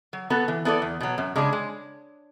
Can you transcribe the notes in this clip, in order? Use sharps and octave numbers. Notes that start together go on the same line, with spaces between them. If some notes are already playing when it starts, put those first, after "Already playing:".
F#3
B3 F#4 A4
E3
B3 E4 A4 D5
E2
B2 F#3
F#2
C#3 G#3 D4 G#4
G#3